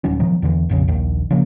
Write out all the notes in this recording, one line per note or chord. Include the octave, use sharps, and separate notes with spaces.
D#1 D#3 F#3 C#4
B2 D#3 F3 F#3
E2 D3 E3
A#1 F2 C#3
A#1 D#2 D#3
C#3 F3 F#3 A#3